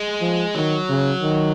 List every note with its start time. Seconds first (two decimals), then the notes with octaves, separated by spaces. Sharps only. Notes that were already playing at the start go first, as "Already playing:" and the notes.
Already playing: G#3
0.21 F3
0.55 D#3 F#3
0.89 C#3
1.22 D#3